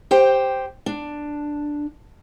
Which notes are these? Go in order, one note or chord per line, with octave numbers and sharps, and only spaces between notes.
G4 C5 G5
D4